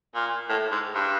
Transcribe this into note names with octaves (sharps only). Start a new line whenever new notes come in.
A#2
A2
G#2
G2